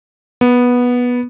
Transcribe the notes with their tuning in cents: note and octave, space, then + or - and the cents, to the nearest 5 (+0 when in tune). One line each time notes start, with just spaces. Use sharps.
B3 -10